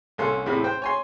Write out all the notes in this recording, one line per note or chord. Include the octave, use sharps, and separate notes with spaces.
C2 A#3 C#4 A4 C6
E2 A2 C3 B5
C5 G5
C#5 G#5 C6